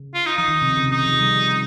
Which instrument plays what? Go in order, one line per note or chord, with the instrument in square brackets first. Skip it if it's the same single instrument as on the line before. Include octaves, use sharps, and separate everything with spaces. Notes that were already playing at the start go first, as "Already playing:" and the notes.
Already playing: [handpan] C#3
[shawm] F4
D#4
[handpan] F3 [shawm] D#4
[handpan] D#3
C3
C#3
[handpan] C3 [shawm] D#4
[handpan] F3
G3